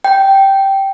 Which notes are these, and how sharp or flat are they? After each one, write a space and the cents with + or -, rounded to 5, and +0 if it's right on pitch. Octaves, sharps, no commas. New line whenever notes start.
G5 -10